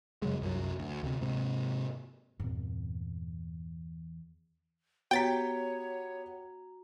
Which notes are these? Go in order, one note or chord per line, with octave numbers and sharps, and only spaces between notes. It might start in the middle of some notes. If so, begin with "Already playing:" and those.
F#2 C#3 F#3 G#3
C2 F#2 F3 F#3
D2
D2 C3
G#2 C3
E2 G2 A#2 C4
B3 F#4 G4 C#5 G5 A#5 A6 B6